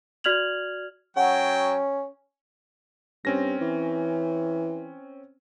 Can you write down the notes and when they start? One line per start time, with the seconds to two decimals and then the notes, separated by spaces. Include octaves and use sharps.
0.24 F#4 D5 F6 G#6 F7 F#7
1.17 F#3 C#4 F#5 G5
3.25 G2 C4 C#4 A#6
3.61 E3